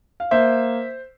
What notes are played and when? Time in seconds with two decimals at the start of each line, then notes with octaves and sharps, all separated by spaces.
0.20 F5
0.31 A#3 C5 E5